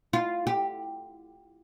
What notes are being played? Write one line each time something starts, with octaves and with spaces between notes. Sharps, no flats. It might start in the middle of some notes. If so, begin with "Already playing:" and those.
F4
G4